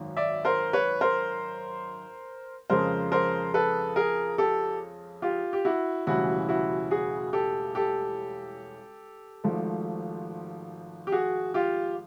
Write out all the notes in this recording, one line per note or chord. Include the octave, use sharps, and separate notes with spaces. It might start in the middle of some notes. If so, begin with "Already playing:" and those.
Already playing: G#1 F#2 D#3
D5 E5
A#4 C5
B4 C#5
A#4 C5
F2 C#3 F3 G#3 A#4 C5
A#4 C5
A4 B4
G#4 A#4
G4 A4
F4 G4
G4
E4 F#4
E1 D2 C#3 E3 G3 E4 F#4
E4 F#4
F#4 G#4
G4 A4
G4 A4
G#1 G#2 F3 A3
G4
F#4 G#4
F4 G4